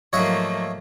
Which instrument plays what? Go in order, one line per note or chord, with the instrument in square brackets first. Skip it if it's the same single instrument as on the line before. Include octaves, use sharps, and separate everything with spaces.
[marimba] G#2 F#3 [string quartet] F3 A3 A#3 [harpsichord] C#5 D#5 E5